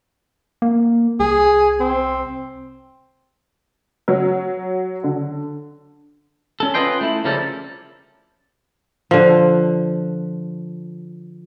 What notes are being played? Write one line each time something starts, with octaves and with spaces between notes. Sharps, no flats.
A#3
C2 G#4
C4
F#3
D3
C#4 A4
C#4 F4 B4 D#5 G5 C6
A3 E4
C#3 F3 G3 A#3 A4
D3 F3